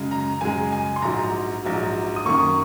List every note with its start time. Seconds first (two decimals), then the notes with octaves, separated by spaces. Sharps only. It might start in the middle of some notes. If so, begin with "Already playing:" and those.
Already playing: F#2 C#3 G#3
0.11 A#5
0.41 F#2 C#3 G#3 G#5
0.72 G#5
0.96 C6
1.02 A#1 G#2 F#3 A#5
1.64 A#1 G#2 F#3
2.16 D#6
2.25 F#2 D#3 A#3 C#6